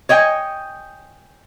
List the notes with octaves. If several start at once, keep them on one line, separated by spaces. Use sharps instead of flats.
C#5 D#5 G5 G#5